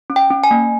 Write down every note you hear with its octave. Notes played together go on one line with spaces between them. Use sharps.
C#4
G5
C#4
G#5
A#3